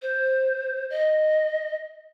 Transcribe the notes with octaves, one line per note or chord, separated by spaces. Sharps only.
C5
D#5